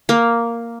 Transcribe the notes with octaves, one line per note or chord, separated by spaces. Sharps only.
A#3